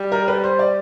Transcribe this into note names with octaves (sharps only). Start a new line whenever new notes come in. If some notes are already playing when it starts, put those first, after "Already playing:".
Already playing: G3
A#4
B4
C5
D5